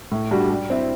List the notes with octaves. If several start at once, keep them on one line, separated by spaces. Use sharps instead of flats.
A2
G3 D4 F#4
G3
C4 E4